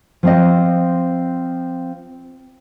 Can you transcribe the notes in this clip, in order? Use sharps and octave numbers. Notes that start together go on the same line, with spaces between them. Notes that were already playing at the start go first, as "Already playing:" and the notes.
F3 C4 D#5